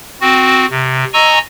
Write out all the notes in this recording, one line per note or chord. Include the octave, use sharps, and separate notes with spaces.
C4 F#4
C3
D#5 G#5 A#5 C#6 E6